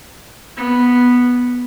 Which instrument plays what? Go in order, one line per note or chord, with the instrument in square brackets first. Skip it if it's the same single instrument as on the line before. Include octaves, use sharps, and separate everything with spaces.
[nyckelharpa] B3